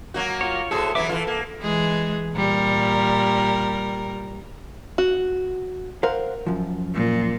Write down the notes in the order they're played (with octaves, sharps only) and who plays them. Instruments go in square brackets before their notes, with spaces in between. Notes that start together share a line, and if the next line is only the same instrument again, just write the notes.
[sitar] F#3 A#3 F#4
[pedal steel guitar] F4 C#5
[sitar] A2 F#4 G#4 [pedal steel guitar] A4 C5
[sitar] E3 F#3 B3 [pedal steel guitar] E5 D6
[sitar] E3 F4 [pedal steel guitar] A4
[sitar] A#3
[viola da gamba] E3 G#3 G#4
A#2 G3 A#4
[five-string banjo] F#4
[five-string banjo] A#4 [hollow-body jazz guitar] C5 F5 F#5
[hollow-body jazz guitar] F#2 F3
[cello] A#2